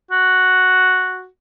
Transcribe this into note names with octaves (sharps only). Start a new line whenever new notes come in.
F#4